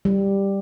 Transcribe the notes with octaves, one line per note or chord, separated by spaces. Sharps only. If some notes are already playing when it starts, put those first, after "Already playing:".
G3